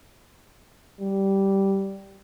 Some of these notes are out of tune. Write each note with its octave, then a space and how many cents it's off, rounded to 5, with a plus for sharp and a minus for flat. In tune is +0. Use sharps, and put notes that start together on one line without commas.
G3 -10